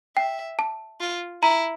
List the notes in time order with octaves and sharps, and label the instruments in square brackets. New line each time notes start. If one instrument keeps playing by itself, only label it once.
[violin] E5 [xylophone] G5
[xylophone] A5
[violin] F4
[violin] E4 [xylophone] A#5